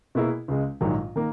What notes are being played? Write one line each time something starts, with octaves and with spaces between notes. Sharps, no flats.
B2 A#3 E4 G#4
C#2 C#3 G#3
A#1 G#2 D#3 F#3
D#3 A#3